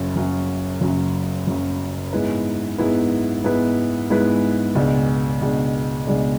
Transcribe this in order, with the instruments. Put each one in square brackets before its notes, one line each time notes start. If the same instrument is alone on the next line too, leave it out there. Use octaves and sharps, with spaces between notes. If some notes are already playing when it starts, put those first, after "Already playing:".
Already playing: [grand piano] F#1 F#2 C#3
F#1 F#2 C#3
F#1 F#2 C#3
F#1 F#2 C#3
G#2 G#3 B3 E4 B4
G#2 G#3 B3 E4 B4
G#2 G#3 B3 E4 B4
G#2 G#3 B3 E4 B4
C#2 B2 G#3 D4
C#2 B2 G#3 D4
C#2 B2 G#3 D4